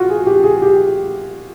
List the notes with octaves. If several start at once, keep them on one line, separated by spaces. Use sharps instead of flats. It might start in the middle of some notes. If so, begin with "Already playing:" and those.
Already playing: F4 F#4
G#4
G4
G#4
G4